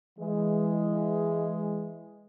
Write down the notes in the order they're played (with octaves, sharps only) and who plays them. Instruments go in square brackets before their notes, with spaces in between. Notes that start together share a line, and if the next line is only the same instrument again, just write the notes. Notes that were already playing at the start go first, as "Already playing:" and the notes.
[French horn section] E3 G#3